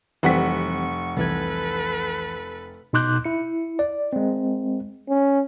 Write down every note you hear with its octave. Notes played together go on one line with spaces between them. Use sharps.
F1 E3 G3 C4 F#5 C#6 B6
C2 E3 A4 B4 G#6
B2 D#4 C6 D6 F#6 G6
E4 C#7
D5
G#3 C4
C#4